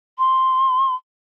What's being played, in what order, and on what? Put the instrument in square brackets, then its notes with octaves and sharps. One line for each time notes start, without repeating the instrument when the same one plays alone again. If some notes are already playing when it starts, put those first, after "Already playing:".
[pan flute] C6